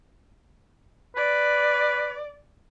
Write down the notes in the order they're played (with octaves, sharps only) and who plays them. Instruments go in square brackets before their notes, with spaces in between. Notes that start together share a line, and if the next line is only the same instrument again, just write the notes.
[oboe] B4 [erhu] D5